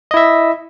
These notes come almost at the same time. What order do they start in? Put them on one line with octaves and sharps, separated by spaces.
D#5 E4 E5